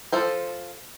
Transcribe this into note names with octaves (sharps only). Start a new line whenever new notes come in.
F3 A4 C5